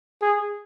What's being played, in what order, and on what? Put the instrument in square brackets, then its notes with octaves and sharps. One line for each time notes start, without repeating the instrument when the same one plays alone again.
[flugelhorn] G#4